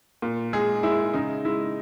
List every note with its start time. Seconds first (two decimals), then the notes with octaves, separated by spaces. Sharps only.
0.22 A#2
0.53 G#3 G#4
0.83 G#3 E4
1.14 C#3 D#4
1.45 G#3 E4